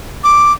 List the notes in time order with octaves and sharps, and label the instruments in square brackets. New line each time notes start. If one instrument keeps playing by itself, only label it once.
[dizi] D6